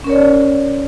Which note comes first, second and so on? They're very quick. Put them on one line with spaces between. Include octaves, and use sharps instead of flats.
C#4 A#4 C#5 D5